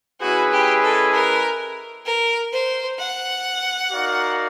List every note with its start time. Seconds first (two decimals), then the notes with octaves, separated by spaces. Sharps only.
0.21 G#3 C#4 E4 F#4 G#4 B4
0.52 G4
0.83 A4
1.13 A#4
2.05 A#4
2.53 C5
2.99 F#5
3.91 D#4 F#4 A#4 D5 F5